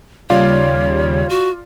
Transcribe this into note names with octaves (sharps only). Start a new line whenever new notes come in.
D#2 C#3 G3 F4 C#5 D5 F5
F#4